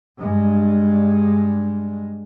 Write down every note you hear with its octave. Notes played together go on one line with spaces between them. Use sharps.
G2 G#3